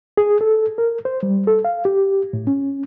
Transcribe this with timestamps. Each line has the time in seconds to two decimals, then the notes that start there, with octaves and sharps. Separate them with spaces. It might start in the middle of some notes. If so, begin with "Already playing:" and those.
0.17 G#4
0.41 A4
0.78 A#4
1.05 C5
1.23 G3
1.47 A4
1.65 F5
1.85 G4
2.33 A2
2.47 C#4